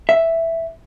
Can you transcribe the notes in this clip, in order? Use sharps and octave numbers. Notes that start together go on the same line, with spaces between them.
E5